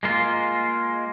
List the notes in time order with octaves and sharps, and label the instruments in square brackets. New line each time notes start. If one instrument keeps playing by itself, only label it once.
[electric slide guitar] G#3 A#3 F4